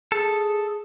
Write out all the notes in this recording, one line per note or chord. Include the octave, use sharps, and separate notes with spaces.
G#4 A4